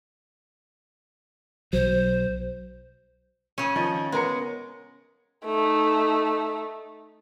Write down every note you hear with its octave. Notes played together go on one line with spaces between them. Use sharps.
B1 F#3 C5
C#3 C#4
D#3 F3 D#4
G#3 B3 A#4 C#7
A3 D#4